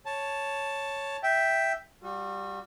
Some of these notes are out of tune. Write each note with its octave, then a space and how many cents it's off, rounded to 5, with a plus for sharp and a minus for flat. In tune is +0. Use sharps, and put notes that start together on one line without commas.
C#5 +0 A5 +0
E5 +0 G5 +0
G3 +0 F#4 -40